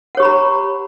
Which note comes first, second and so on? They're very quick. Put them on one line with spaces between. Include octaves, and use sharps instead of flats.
F#5 C#5 G4 B5 A#5